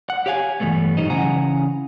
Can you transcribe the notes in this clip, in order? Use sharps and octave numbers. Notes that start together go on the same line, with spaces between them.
F#5
G4 C#5 F5 G5 G#5
B1 G2 E3 G3 A3 B3
G#2 F#3 G3 D#4 C5 D#5
C#3 E3 C#4 F#5 G#5 A#5